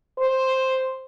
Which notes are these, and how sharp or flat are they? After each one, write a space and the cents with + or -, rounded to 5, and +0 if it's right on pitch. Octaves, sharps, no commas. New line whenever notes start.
C5 +5